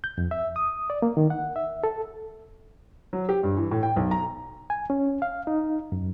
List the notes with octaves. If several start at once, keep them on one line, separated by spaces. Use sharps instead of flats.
G6
F2
E5
D#6
D5
A#3
D#3
F#5
E5
A4
F#3
G4
G2
E3
A2
G5
B1
A#5
G#5
C#4
F5
D#4
F#2